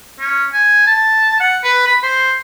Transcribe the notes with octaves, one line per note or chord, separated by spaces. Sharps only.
C#4
G#5
A5
F#5
B4
B5
C5